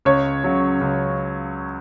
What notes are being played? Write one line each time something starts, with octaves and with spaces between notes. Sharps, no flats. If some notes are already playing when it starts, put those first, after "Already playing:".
C#2 C#5
C#3 F#3
C#2